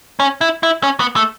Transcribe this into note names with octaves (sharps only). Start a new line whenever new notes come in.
C#4
E4
E4
C#4
B3
A3